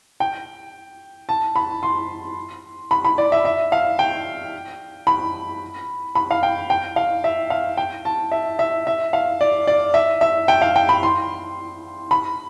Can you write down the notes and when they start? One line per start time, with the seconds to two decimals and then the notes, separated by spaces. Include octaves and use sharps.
0.20 G5
1.29 A5
1.56 B5
1.83 C6
2.91 B5
3.05 B5
3.18 D5
3.32 E5
3.45 E5
3.72 F5
3.99 G5
5.07 B5
6.15 B5
6.31 F5
6.43 G5
6.70 G5
6.96 F5
7.24 E5
7.50 F5
7.77 G5
8.05 A5
8.32 E5
8.59 E5
8.87 E5
9.13 F5
9.41 D5
9.67 D5
9.94 E5
10.21 E5
10.48 G5
10.62 F5
10.76 G5
10.89 B5
11.03 C6
12.11 B5